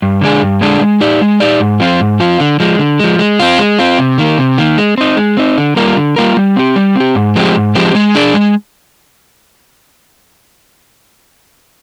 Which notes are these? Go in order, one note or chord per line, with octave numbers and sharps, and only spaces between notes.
G2
D3 G#3 D4 G#4
G2
D3 G#3 D4 G#4
G#3
D#4 G4 D5
G#3
D#4 G4 D5
G#2
F3 C4 F4
G#2
F3 C4 F4
D3
F3 G#3
D3
F3 G#3
G#3
C4 F4
G#3
C4 F4
C3
D#3 A#3
C3
D#3 A#3
G#3
C4 D#4
G#3
C4 D#4
D3
G3 A#3 F4 A#4
D3
G3 A#3 F4 A#4
G3
C4 G4
G3
C4 G4
G#2
F3 G#3 C4 G4
G#2
F3 G#3 C4 G4
G#3
D4 G#4 D5
G#3